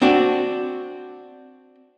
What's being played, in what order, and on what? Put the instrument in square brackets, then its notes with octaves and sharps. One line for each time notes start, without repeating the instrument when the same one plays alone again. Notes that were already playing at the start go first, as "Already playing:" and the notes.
[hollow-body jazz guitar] C4 D4 F#4